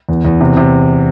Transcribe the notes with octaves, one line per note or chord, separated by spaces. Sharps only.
E2
E2
C3
C3